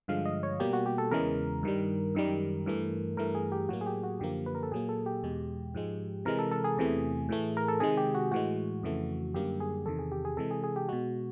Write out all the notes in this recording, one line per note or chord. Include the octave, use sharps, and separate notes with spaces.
G2 D3 F3 G#3 F5
D#5
C#5
B2 G3 A#3 G4
F#4
G4
A4
E2 C#3 E3 G#3 A#4
G2 D#3 G3
F#2 D#3 G3
G2 E3 A3
G2 E3 A3 A#4
G#4
G4
A2 F#3 A#3 F#4
G#4
G4
F#4
F#2 D3 F3 A#3 G4
B4
A#4
A4
A#2 F#3 A#3 G#4
A4
G4
E2 B2 G#3
G#2 F3 G#3
C3 E3 G#3 A#4
A4
A4
G#4
E2 C3 E3 A3
A2 E3 A3
A#4
A4
C3 D#3 G#3 G#4
G4
F#4
A2 E3 G#3 F#4
F2 C#3 E3 A3
F#2 D3 G3 A#3 G4
G#4
E2 C3 D#3 A4
G#4
G4
G#4
C3 E3 G#3 A4
G#4
G#4
G4
B2 G#3 F#4